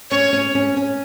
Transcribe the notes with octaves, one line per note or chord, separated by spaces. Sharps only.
C#4 C#5
C#4
C#4
C#4